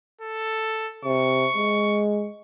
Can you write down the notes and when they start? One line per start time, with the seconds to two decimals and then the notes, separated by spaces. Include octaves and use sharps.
0.21 A4
1.05 C3 C#6
1.55 G#3